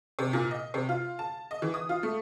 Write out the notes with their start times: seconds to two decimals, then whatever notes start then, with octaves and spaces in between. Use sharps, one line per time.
0.19 C3
0.33 A#2
0.51 D#5
0.74 C3
0.89 F4
1.19 A5
1.51 D#5
1.62 E3
1.74 D#6
1.89 F4
2.03 A3